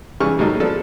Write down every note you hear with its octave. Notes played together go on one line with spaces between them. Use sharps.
C#3 E3 G3 C#6 F6
A2 F#3 G3 A3 A#3 D#4
F3 B3 D4 A4